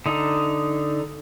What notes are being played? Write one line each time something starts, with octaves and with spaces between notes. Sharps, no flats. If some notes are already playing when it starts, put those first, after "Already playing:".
D3 D#4